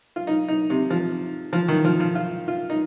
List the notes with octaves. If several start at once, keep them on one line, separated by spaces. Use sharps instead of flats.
F4
D#4
D#4
C3
F3
F3
D#3
F3
F3
F4
F4
D#4